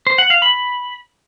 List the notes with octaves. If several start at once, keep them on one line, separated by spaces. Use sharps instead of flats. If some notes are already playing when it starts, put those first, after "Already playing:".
C5
F#5
F5
B5